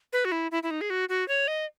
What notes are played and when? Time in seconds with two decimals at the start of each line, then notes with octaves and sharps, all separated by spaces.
0.13 B4
0.25 F#4
0.32 E4
0.51 E4
0.63 E4
0.71 D#4
0.81 G#4
0.90 F#4
1.09 F#4
1.28 C#5
1.48 D#5